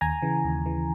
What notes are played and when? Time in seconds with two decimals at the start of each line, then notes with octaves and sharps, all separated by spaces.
0.01 D#2 G#5 A#5
0.22 C#3 E3
0.45 D#2
0.66 C#3 E3